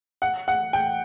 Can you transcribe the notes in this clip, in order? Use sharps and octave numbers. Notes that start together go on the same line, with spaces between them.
F#5
F#5
G5